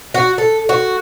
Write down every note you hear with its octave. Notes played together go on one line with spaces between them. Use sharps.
F#4
A4
F#4